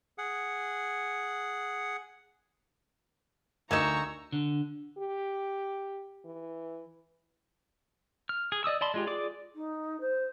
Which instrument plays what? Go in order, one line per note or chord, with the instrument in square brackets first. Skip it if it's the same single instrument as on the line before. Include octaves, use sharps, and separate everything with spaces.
[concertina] G#4 F#5
[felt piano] D2 G#6 E7 [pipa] A#3 D#4 [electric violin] A#5 [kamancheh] C#6 E6
[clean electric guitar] D3
[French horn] G4
E3
[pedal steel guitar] F6
G#4
D5 D#5 D#6 E6
D5 D#5 A5 B5 C6
G#3 F4 G4
F4 G#4 D5 D6
[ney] D#4
C5